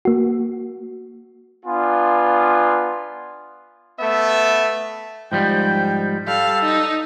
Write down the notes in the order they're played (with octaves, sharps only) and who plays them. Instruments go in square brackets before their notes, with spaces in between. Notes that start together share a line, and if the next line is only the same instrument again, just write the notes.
[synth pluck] A#3 F#4
[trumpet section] B3 D4 F4 G#5
A3 B3 E5
[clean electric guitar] G#2 F3 G3 [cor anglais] G5
[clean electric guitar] G3 [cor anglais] A4 [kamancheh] F5
[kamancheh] D#4